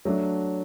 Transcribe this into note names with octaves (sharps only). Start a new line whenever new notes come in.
F#3 A3 D4